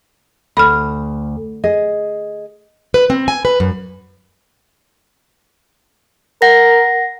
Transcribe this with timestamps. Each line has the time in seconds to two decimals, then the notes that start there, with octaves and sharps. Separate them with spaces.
0.57 D2 B5 F6
1.64 G#4 D#5
2.94 B4
3.10 C4
3.28 G#5
3.45 B4
3.60 F#2
6.42 A#4 F#5 A#6